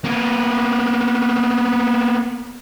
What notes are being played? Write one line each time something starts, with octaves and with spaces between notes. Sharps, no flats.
A#3 B3